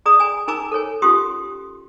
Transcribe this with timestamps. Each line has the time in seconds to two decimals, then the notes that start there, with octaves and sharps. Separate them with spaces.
0.06 G#4 D5 A#5 D#6
0.20 D5 G#5 A#5
0.48 D#4 A#4 G#5 A#5 D6 E6
0.72 A4 A#4 C#5 G#5
1.02 C#4 F4 G4 C6 C#6 D#6